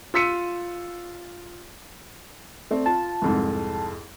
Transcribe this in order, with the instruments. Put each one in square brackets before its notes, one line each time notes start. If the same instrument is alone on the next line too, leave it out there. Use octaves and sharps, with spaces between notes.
[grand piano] F4 E6 B6 C#7 D#7
[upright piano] A3 C4 D5
[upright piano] F4 [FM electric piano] A5
[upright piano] C2 F2 G#2